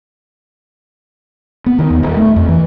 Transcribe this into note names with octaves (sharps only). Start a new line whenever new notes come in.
B3
D#3
D#2
D#1
A3
F2
E3